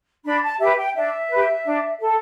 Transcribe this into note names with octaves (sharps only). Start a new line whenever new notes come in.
D4 B5
A5
G4 B4 E5
G5
D4 E5
G4 B4
D4
A4